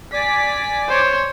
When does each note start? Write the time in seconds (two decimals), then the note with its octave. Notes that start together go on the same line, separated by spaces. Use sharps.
0.13 D5 G#5 D6 B6
0.88 C5 C#5